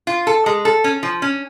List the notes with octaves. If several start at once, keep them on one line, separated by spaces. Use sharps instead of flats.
F4
A4
G#3
A4
C#4
F3
C#4